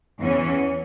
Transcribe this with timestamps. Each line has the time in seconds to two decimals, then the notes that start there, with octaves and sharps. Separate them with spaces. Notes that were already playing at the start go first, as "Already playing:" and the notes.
0.20 E2 E3 C#4